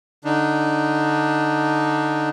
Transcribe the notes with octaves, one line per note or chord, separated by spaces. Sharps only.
D3 D4 D#4